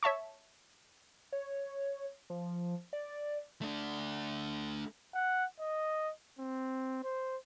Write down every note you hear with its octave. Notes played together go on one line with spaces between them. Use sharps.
C#5 E5 A5 C#6
C#5
F3
D5
A3 D4
F#5
D#5
C4
C5